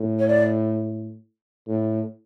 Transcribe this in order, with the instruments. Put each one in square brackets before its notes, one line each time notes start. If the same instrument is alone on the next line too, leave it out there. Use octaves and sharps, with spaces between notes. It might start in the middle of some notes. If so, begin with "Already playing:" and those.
Already playing: [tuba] A2
[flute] C#5
D5
[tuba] A2